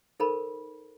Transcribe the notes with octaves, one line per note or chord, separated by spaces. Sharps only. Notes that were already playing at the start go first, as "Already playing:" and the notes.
D#4 A4 A#4 C5 A5 B5